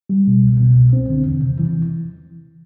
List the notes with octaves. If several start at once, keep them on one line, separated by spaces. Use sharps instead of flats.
G3
B2
C2
B2
C2
C4
D3
E2
C3
E3